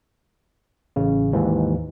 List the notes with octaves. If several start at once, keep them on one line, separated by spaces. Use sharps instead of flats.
A1 C#3
D#2 G#2 E3